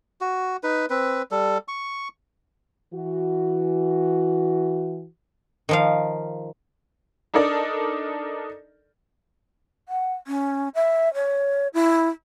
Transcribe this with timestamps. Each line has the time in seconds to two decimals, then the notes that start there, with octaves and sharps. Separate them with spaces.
0.21 F#4
0.63 D#4 B4
0.90 C4 B4
1.31 G3 A4
1.68 C#6
2.93 E3 F#4
5.69 D#3 F3 F5
7.34 D4 D#4 A4 A#4 D5
9.89 F#5
10.27 C#4
10.75 E5
11.14 C#5
11.74 E4